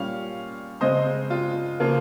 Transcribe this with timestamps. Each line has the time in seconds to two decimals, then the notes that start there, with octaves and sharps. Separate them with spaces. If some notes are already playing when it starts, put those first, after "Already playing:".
Already playing: A#2 G3 C#4 F5
0.81 C#3 G#3 C4 C5 D#5
1.30 F4
1.80 C#3 F3 A#3 F4